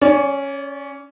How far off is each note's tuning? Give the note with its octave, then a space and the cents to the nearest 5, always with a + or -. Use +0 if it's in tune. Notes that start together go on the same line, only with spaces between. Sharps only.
C#4 +0 D5 -35